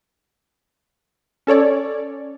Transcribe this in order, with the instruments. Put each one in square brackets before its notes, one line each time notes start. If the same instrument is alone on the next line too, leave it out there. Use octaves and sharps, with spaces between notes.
[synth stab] C#4 A4 C#5 D5